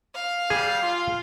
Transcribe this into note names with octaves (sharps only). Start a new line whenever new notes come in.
F5
G3 G#4
F4